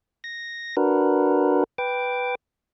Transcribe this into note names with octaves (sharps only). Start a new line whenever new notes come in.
A#6
D4 F#4 A#4 B4
B4 G5 D6